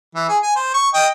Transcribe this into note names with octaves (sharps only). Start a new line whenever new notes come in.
E3
G#4
G#5
C5
C#6
D#5 G5